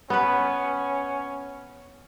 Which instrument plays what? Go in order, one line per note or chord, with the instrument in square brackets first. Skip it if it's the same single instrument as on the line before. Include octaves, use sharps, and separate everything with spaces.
[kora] B3 B4 [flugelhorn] C#4